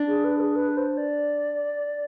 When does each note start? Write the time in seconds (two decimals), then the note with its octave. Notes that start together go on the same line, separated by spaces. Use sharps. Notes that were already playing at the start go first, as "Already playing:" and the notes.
Already playing: D4
0.08 G#4
0.24 B4
0.40 G#4
0.55 B4
0.77 C5
0.97 D5